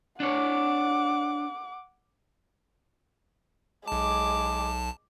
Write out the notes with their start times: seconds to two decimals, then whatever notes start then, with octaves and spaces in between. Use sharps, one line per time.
0.20 D4 C#5 F#5 D6
3.88 B1 G#3 A5 D6